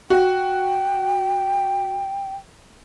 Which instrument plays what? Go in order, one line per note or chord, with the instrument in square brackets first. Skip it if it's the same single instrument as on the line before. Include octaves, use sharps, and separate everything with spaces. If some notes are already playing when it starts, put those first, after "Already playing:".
[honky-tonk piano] F#4 [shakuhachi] G5